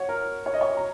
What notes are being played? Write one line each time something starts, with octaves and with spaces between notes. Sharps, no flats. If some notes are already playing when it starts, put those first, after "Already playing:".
Already playing: C#5 F#5
A#4
C#5
D#5
C#5
A#5